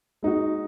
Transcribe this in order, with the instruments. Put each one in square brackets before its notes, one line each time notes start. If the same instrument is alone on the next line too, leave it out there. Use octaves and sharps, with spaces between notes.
[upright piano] G#3 D#4 F#4